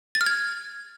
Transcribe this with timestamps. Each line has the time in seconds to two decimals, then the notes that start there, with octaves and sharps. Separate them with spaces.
0.15 A6
0.21 F6
0.26 G#6